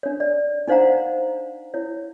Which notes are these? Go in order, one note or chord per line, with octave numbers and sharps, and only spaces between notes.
D4 C#5
D5
D4 D#4 C5 F5 F#5 A#5
E4 C#5